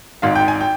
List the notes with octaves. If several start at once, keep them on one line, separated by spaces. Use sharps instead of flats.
G#1 G#2 D#3 F5
G5
G#5
G5